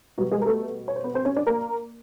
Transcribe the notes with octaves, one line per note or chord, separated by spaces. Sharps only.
B2 F#3 G3 F#4
G#3 G#4
A#4
A3 A4
C#5
C5
B3 B4
C4 C5
C#4 C#5
D4 D5
A#3 A#4